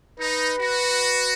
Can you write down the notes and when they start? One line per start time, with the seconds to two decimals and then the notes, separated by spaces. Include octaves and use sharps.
0.19 D#4 B4
0.58 F#4